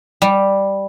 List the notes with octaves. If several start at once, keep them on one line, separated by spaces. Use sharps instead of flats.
G3